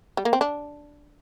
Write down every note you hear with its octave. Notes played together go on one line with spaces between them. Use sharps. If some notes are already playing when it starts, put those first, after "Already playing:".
G3
A#3
C4
D4